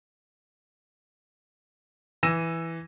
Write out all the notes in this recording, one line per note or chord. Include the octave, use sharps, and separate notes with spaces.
E3 E6 A#6 D#7 E7